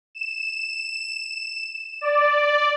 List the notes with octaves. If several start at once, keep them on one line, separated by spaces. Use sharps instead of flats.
E7
D5